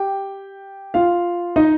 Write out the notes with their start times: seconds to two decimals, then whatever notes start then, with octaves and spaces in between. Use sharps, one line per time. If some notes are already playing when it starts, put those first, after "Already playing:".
Already playing: G4 G5
0.94 F4 F5
1.56 D#4 D#5